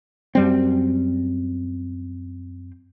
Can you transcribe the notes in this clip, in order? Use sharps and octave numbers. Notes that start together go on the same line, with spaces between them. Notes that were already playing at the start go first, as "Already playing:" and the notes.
F#2 G3 C4